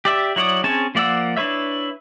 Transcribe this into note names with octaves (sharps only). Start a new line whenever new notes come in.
G4 D5 E5
F#3 E4 C#5 D5 D#6
C4 C#4 G#4 C#5 A5
F3 A#3 D5 F#5 E6
D4 E4 B4 C#5 E5